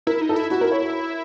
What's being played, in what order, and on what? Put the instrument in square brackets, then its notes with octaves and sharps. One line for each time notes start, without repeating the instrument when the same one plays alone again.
[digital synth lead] E4 [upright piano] A#4
[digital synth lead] D#4
[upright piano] A4
[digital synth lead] E4
[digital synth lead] E4 [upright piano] F#4
[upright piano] A#4
C#5